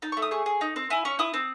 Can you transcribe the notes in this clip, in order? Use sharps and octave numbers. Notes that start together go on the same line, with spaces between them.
D#4 A5
C#6
A3
D#6
G#4 C#6
G#4
D#4
C4
E4 G#5
C#4 C#6
E4 D#6
C4